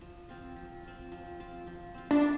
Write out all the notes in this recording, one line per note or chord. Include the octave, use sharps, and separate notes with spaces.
F3
C4 F4
F3
C4 F4
F3
C4 F4
F3
C4 F4
D4